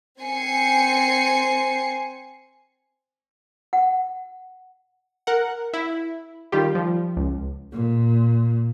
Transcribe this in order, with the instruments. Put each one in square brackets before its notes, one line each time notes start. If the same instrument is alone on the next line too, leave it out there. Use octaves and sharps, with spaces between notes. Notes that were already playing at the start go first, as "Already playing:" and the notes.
[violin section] C4 G#5 C7 C#7
[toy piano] F#5
[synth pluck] A#4 F#5
E4
D#3 G3 F4 G4
F3
C#2
[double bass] A#2